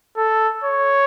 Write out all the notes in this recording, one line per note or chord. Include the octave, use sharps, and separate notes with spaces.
A4
C#5